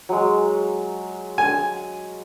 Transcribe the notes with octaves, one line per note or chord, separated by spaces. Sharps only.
F#3 G#3
G#5